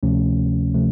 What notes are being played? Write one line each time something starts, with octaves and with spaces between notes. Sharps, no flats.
D2 C3 F3 A3 C#4
C3 F3 A3